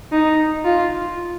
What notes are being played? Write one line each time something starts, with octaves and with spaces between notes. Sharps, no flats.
D#4
F4